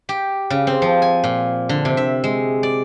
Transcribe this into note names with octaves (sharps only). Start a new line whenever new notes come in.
G4
C#3
C4
F3
G#5
A#2
D3
C3
E5
G#3
D5